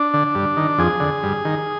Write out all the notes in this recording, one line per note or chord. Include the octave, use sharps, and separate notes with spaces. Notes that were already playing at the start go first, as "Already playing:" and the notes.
Already playing: D4
D3
G2
D#3
F2 G#4
D3
G2
D#3